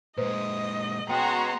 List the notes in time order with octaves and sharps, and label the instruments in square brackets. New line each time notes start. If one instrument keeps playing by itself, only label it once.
[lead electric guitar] A#2 G#3 [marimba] B4 C5 [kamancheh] D#5
[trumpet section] G#3 C#4 F#4 [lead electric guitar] B3 [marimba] G5 [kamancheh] A#5 C6